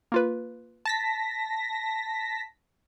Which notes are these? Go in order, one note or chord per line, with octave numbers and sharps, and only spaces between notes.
A#3 F4 B4
A5 A#6 B6